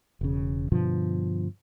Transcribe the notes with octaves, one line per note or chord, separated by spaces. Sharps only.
E1 C#3
G2 B2 D3 F3